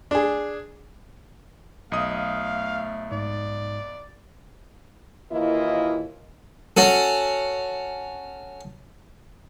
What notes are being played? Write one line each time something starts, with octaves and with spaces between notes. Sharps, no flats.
D4 G#4
B1 A3 D#5 F5 D#6
G#2 D5
D#2 E3 A#3 E4 F4 D#5
C#4 F#4 A4